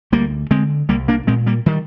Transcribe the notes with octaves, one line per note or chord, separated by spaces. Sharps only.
D2 G3 A#3
D3 G#3 C4
C2 G3 A#3
A#3 D4
A#2 G#3 C4
G3 A#3
D#3 G3